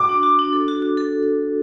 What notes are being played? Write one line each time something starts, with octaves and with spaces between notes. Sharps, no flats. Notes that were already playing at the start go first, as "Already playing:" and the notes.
Already playing: F#4 D6
D4
F#4
D4
A4
F#4
F#4
A4